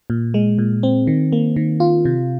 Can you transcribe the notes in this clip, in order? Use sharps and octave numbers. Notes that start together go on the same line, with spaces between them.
A#2
G#3
A#2
C4
D#3
A#3
D#3
F4
C3